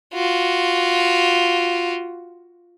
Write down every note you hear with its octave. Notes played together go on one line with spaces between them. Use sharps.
F4 F#4